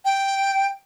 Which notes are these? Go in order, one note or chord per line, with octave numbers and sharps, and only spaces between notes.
G5